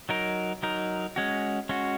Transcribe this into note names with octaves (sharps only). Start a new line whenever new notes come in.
F#3 D#4 A#4
F#3 D#4 A#4
G#3 C#4 F#4
G#3 C#4 F#4